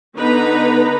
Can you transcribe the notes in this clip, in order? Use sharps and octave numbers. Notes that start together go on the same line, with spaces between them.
D3 B3 D#4 B4 A#5 B5